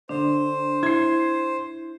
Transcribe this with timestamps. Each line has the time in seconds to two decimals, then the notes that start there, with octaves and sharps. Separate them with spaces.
0.09 D3 D4 C5
0.83 E4 G#6 C7